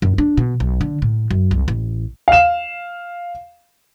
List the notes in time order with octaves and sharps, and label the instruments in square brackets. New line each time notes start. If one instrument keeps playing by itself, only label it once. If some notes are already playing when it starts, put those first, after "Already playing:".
[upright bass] F#2
D4
B2
B1
D3
A2
F#2
C2
A1
[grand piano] F5 E7